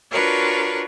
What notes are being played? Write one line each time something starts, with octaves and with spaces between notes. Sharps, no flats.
D4 F4 F#4 A#4 B4 C#5